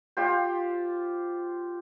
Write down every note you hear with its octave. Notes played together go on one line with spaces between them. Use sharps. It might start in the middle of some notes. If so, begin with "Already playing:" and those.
F4 G4 C5